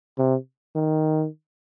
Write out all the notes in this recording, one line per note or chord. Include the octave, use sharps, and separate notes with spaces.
C3
D#3